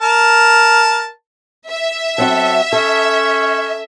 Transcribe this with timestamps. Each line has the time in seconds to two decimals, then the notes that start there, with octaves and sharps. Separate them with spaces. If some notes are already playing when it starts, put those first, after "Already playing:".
0.02 A#4 A5
1.69 E5
2.18 F#3 C4 F#4 A4
2.73 C#4 A4